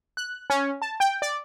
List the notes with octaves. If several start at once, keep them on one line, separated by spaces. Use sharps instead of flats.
F#6
C#4
A5
G5
D5